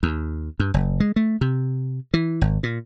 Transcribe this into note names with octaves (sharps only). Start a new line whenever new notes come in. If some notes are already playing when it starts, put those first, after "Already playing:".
D#2
G2
F#1
G#3
A3
C3
E3
G#1
A#2